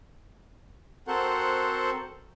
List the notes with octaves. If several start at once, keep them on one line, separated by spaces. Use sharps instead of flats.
C4 F#4 A4 A#4 C5 F#5